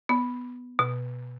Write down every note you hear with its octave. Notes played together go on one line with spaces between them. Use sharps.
B3
B2